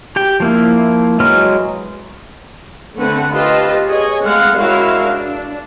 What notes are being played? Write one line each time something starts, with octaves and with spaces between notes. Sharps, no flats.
G4 G5
F3 A#3 E4
F#3 G#3 E4 B4 F6
D3 A3 C4 B4 F#5
F4 G4 B4 C5 D#5 A5
G#4 C#5 D#5 G#5
G#3 A3 C4 F5 F#5
G#3 C#4 E4 F#4 A#4 F5
D4